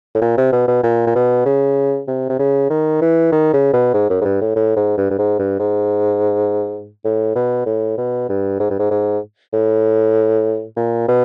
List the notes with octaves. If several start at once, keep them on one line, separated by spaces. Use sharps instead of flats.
A2
A#2
C3
B2
B2
A#2
A#2
B2
C#3
C3
C3
C#3
D#3
E3
D#3
C#3
B2
G#2
F#2
G#2
G2
A2
A2
G#2
G2
G2
G#2
G2
G#2
A2
B2
A2
B2
G2
G#2
G2
G#2
G#2
A2
A#2
B2